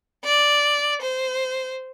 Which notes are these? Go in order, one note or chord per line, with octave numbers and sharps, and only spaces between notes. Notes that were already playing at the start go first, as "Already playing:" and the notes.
D5
C5